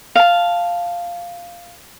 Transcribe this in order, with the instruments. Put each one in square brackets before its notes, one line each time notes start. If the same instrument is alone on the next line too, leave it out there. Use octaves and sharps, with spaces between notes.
[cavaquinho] F5 A5